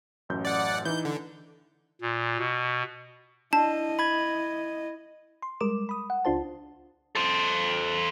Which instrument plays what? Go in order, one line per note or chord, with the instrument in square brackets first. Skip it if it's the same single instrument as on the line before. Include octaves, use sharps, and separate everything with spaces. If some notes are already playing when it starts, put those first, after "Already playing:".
[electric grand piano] A1 F#2 G6
[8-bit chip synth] D5 F#5
[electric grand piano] E3 D#4 [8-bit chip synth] G6
[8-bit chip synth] D3
[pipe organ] A#2
B2
[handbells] D4 [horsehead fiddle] E4 D#5 [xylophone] A5
[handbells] B5 G#6
[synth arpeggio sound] C6
G3 G#3 A#4 D6 E7
B5 D#6
F#5
C#2 D4 F4 C5 A5
[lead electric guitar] A4 C5